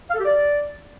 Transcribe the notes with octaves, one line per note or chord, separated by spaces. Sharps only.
F5
A4
G4
D5